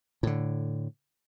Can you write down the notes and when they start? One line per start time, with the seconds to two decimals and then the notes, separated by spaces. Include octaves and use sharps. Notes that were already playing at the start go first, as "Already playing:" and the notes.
0.23 A2 D3